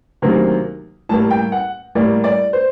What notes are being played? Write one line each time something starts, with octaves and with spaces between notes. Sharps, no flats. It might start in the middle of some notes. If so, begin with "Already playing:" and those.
D2 C3 D#3 F#3 A#3
A2 G3 A#3 A5
G5
F#5
A2 G3 A#3 D5
D5
C5